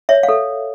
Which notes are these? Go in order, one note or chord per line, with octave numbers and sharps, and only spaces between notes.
C#5 E5
F5
A4